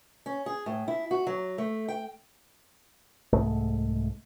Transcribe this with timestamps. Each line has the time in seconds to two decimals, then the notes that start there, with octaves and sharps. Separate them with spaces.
0.26 C#4
0.46 G#4
0.66 A2
0.88 E4
1.11 F#4
1.27 F#3
1.58 A3
1.88 G5
3.33 C2 G#2 G#3 A3